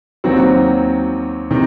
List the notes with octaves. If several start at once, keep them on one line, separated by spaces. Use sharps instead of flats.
D#2 D#3 F#3 C4 F#4
C3 D#3